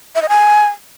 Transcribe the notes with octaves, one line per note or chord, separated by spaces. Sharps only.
E5
D#5
G#5